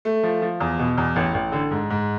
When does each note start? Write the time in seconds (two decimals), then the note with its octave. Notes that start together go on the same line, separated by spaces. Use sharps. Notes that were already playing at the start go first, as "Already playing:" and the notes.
0.05 A3
0.23 F3
0.42 F3
0.60 E2
0.79 B2
0.97 E2
1.16 A1
1.34 A1
1.52 D3
1.71 G#2
1.90 G#2